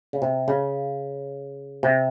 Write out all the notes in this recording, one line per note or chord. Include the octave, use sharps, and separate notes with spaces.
C#3
C3
C#3
C3